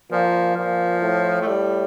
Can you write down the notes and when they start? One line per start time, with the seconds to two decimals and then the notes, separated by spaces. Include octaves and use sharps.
0.11 A#2 F3
0.56 A#2 F3
1.02 A2
1.42 A3
1.47 G3